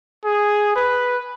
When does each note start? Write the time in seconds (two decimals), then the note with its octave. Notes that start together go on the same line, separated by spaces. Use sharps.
0.25 G#4
0.76 B4